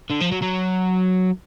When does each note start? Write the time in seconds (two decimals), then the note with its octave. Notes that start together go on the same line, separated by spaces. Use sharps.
0.10 D3
0.20 F3
0.31 F#3
0.42 F#3